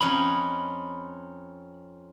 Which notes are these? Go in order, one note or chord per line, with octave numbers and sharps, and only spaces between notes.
F2 C#4 D#4 B5